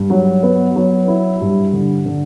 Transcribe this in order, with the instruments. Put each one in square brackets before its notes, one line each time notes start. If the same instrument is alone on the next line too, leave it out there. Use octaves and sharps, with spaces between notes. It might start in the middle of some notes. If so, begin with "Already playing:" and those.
Already playing: [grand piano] G2
F#3
B3
F#3
E4
G2
D3
D3